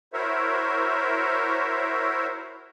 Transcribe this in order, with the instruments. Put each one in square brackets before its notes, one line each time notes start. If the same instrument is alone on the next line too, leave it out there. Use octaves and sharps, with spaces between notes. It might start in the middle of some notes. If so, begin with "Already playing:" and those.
[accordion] E4 F#4 A#4 C5 C#5 E5